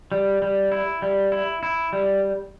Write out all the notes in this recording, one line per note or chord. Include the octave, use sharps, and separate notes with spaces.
G3
G3
E4
G3
E4
E4
G3